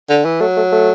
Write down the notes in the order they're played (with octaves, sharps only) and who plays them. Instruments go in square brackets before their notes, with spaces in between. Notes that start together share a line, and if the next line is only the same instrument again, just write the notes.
[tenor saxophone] D3
E3
[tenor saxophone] F#3 [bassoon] A3
[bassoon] A3
A3